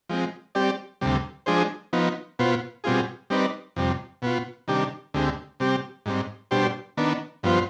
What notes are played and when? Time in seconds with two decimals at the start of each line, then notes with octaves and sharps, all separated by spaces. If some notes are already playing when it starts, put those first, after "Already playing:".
0.09 F3 G#3 C4
0.55 G3 C4 G4 D5
1.01 D2 C3 G3
1.46 F3 G#3 D4 G#4 C5
1.93 F3 B3 D#4
2.39 B2 B3 F4 C5
2.84 B2 G3 C4 F4 G#4
3.30 G3 C4 D#4 B4 D5
3.76 F2 C3 G3
4.22 B2 B3 F4
4.68 C3 D#3 G3 D4 G4
5.14 D2 D3 G#3 C4 G4
5.60 C3 G3 C4 G4
6.06 G#2 G3 C4
6.51 B2 G3 D4 G4 C5
6.97 D#3 B3 D4
7.43 G2 F3 B3 F4 C5